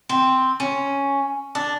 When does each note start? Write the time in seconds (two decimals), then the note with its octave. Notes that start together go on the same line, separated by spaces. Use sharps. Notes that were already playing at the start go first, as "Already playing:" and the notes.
0.09 C4
0.60 C#4
1.55 D4